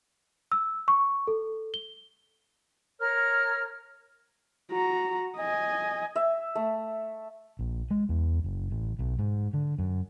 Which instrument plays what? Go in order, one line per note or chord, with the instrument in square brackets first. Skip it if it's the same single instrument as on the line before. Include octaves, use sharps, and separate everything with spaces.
[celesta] E6
C#6
A4
G7
[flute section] A#4 C#5 F6
[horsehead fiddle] F#4 A#5
D#5 G#5
[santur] E5
A3
[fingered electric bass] A#1
G#3
E2
F#1
A1
B1
G#2
D3
F#2